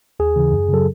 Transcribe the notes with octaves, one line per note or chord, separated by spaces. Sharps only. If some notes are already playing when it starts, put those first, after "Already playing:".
D#2 G#4
C#3 E3
F#2
C#3 F#3 A4